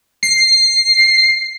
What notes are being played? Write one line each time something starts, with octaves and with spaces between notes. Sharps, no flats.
C7